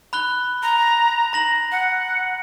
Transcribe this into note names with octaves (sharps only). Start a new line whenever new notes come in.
B5 F#6 G7
A#5
A#5 A#6 F#7
F#5